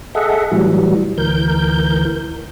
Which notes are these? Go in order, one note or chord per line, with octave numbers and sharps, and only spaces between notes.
G#4 A4 D#5 E5 F#5
A2 E3 F#3 G3
D2 E3 A#4 G6